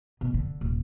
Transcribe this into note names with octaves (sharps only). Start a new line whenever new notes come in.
B2
D3
D#1